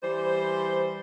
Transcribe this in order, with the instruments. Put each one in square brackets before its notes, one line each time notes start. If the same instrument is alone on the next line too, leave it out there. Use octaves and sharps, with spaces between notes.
[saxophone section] E3 G3 C5